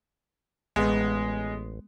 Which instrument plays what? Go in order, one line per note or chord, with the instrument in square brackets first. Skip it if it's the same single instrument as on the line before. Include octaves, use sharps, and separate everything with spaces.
[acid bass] A1 [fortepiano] G#3 B3